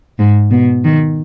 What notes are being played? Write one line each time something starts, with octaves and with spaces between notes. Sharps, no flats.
G#2
B2
D#3